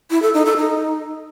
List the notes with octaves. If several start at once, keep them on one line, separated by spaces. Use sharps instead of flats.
E4
A4
D#4
A4
D#4